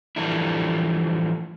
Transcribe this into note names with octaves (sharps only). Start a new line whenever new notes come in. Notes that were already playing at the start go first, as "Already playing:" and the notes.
E3 F3 G3 A3 D4 E4